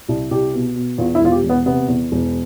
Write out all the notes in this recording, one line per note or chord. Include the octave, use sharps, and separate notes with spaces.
C2
C2 G4
B2
B2
E2 F4
E4
E1 F4
G4
E1
B3
C3 B3
E2
E1